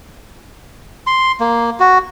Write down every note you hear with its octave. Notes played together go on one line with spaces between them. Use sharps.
C6
A#3
F#4